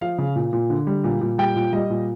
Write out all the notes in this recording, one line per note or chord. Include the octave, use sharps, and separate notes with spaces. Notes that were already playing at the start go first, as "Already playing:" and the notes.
F3 F5
C#3
A#2
A#2
D3
G3
A#2
A#2
G3 G5
A#2
G3 D#5
A#2